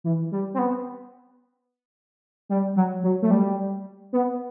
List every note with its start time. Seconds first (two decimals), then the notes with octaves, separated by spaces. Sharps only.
0.04 E3
0.32 G3
0.54 C4
0.59 B3
2.49 G3
2.76 F#3
3.03 F#3
3.22 A3
3.31 G3
4.13 B3